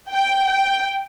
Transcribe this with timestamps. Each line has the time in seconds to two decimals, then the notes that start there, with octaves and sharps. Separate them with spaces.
0.12 G5
0.47 G5